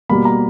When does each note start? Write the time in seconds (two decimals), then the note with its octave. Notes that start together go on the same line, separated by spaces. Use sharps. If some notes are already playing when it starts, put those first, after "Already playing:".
0.10 B2 G3 A#3 B5
0.25 A#5